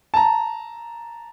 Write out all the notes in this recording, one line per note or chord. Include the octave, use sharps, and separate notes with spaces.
A5 A#5